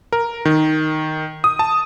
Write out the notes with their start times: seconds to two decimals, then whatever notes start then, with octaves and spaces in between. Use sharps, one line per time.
0.13 A#4
0.45 D#3
1.44 D#6
1.59 A5